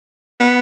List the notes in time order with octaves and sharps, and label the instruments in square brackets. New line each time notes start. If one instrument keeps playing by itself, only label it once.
[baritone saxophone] B3